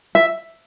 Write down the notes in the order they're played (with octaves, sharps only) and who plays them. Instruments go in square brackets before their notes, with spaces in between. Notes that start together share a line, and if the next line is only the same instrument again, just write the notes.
[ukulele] E5